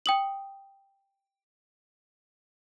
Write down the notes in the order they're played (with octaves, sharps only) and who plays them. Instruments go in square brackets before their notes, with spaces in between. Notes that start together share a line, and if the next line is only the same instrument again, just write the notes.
[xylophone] G5 D#6 F#7